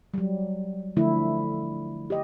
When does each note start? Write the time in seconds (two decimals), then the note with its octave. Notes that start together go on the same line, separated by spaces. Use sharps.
0.14 F#3 G3
0.97 D3 F3 A3 E4
2.10 G4 D#5